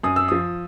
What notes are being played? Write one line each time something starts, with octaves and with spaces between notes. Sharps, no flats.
F#2 D#6
E6
F3 D#6